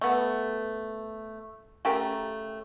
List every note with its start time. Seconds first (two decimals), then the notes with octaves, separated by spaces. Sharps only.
0.01 A3 B3
1.85 C#3 A3 G4 A#4